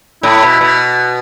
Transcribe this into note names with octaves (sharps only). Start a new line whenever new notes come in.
A2 E4
B2
B2